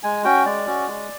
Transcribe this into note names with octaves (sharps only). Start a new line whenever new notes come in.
G#3 G#5
C#4 F#4 G5
G#3 D5
C#4 F#4
G#3